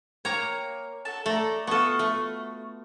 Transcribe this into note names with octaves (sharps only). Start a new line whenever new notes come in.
A#3 C#5 G5 A#5
F#4 A4 A5
A3 A4 D5 A#5
B3 F4 F#4 A4 C#6
A3